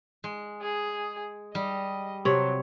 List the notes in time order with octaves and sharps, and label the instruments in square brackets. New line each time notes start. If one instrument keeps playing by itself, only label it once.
[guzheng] G#3
[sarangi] G#4
[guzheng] G3 [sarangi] D#5
[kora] C3 C#5 [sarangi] F#3